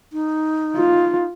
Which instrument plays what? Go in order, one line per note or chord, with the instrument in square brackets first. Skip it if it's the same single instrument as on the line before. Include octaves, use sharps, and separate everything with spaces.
[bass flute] D#4
[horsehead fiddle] F4